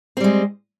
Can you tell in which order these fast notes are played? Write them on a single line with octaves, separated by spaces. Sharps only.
C4 G3 G#3